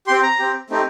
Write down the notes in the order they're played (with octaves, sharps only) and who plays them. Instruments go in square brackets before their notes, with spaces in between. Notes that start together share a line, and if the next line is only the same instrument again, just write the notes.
[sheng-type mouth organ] G4 C6
C4
A#5
C4 G4
A3 C4 D#4 G4